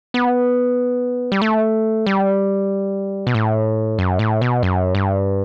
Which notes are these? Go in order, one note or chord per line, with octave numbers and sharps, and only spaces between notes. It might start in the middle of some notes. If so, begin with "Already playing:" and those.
B3
G3
A3
G3
B2
A2
F#2
A2
B2
F#2
G2